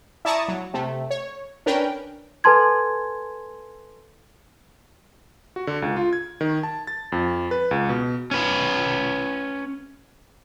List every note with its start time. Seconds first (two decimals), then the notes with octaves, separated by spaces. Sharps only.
0.25 E4 D5 A5 A#5 C#6 D#6
0.48 F#3
0.74 C3 A3
1.10 C#5
1.66 C#4 D4 A#4 B4 G5
2.44 A4 B4 G#5 A5 C6 G#6
5.56 F#4
5.67 D3
5.82 C#2
5.96 F4
6.13 G#6
6.41 D#3
6.63 A5
6.87 A6
7.12 F2
7.51 B4
7.71 C#2
7.89 B2
8.31 C#4 B4